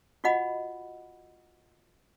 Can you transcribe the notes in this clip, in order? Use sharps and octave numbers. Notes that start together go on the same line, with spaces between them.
F4 F#4 D#5 F#5 B5